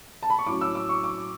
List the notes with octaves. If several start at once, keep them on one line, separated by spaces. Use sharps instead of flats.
A5
B5
C#6
A2 F#3 C#4 D6
E6
D6
C#6
D6